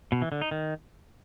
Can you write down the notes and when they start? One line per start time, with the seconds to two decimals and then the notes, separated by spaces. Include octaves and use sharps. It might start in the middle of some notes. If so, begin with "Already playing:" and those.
0.12 B2
0.22 E3
0.32 D3
0.42 D#4
0.51 D#3